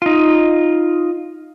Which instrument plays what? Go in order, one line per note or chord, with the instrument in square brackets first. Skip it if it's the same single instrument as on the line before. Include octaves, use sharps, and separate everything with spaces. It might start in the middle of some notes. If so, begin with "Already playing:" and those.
[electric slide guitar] D#4 F4